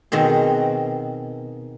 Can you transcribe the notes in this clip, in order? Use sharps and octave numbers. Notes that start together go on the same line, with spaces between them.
B2 D#3 C4 G#4